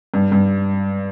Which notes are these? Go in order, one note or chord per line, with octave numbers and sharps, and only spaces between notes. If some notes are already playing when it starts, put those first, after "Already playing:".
G2
G2